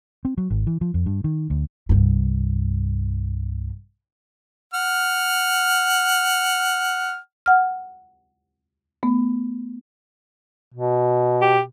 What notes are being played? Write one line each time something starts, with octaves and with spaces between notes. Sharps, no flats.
C4
F#3
G#1
E3
F3
F2
G2
D#3
D2
C2 G2
F#5 F6
F#5 F6
A3 B3
B2
G4